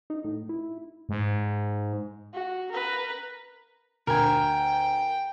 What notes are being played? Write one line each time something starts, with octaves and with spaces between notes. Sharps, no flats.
D#4
A2
E4
G#2
F#4
A#4 B4
D2 A#4 G5 G#5 A#5